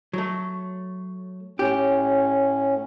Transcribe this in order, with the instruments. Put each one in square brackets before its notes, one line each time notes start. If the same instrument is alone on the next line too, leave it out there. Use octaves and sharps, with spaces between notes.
[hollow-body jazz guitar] F#3 A3
[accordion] A2 C#4 [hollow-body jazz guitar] G4